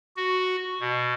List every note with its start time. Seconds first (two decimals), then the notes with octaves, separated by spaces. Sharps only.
0.17 F#4
0.80 B2